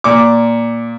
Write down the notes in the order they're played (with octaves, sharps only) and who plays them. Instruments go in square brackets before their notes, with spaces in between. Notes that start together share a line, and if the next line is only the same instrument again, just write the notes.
[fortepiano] A#2 D6